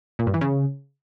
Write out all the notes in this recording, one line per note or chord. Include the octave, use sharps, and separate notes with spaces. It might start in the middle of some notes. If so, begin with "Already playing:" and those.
A#2
G2
E3
C#3